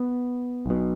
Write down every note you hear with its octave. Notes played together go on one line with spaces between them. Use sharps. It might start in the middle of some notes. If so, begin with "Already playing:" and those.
Already playing: B3
B1 B2